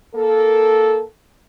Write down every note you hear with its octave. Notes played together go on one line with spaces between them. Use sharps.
A#3 A4